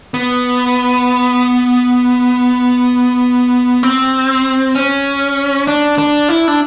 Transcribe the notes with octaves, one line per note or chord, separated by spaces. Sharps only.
B3
C4
C#4
D4
D4
E4
D4